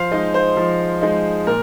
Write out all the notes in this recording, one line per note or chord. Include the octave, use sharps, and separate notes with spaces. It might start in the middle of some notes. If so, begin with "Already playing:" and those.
Already playing: F3 C5 F5
G#3 D#4 D#5
C5
F3
G#3 D#4
A#2 A#4